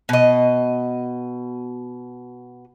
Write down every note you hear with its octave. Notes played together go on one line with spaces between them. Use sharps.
B2 D#5